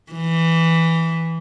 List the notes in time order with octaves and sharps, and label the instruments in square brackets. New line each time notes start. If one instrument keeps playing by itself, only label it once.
[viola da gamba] E3